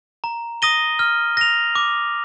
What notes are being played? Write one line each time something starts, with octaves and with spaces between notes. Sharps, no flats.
A#5
D#6 A#6 D#7 G7
F6
A#6 F7
D6